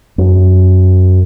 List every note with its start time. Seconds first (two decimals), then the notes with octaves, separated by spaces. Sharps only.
0.18 F#2